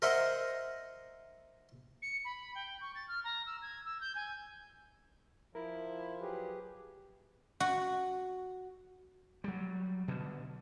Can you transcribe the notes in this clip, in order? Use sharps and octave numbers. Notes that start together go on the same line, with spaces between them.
A#4 C5 D#5 E5 F#5
C#7
B5
G5
C#6
A6
F6
A#5
E6
G#6
E6
G6
G#5
F3 E4 A#4
F#3 G4 G#4 B4
F#4
F#3 G3
B2 D3